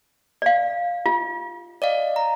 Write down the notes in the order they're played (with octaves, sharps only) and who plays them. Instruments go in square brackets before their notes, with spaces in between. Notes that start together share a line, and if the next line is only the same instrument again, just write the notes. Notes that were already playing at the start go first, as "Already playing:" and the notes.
[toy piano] D5 F5
F4
[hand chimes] D5 D#5 F5
A#5